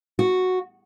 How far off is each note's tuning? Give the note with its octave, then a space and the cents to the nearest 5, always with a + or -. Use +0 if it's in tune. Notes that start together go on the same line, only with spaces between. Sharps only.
F#4 -5